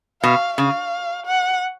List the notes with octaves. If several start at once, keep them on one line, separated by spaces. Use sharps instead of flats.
B2 F5
C#3 F5
F#5